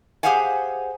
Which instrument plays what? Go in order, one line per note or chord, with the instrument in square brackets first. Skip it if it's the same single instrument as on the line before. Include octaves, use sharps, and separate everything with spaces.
[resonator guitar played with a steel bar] G4 G#4 C5 F5 F#5 G#5